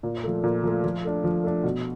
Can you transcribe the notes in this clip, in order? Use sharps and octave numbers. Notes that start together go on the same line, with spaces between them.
A#2
F3 A3
A#2
F3 A3
F3
A3 D4
F3
A3 D4
B2